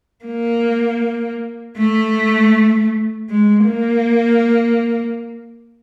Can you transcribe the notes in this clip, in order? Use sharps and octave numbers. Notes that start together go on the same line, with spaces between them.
A#3
A3
G#3
A#3